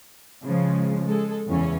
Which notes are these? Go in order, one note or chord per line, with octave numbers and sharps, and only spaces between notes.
C#3 F3 G#3
G#3 A4
E2 C#3 E3 C#4